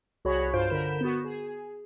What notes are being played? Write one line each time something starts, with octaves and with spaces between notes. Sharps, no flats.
C2 F#4 G#4 C#5 B5
G2 F4 C5 F5 G6 D7
D3 A#4 B5 G6 E7
B3 F#4
G#4